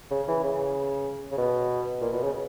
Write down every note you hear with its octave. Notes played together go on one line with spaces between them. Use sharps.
C#3
E3
C#3
C#3
B2
A#2
B2
C#3